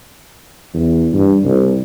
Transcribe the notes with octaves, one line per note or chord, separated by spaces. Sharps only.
E2
G2
C2